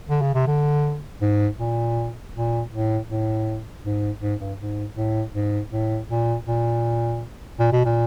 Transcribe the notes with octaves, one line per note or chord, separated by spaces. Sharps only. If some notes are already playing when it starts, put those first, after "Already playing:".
D3
C#3
C3
D3
G#2
A#2
A#2
A2
A2
G#2
G#2
G2
G#2
A2
G#2
A2
A#2
A#2
A#2
B2
A#2